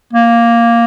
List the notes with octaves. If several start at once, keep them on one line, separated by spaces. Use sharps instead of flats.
A#3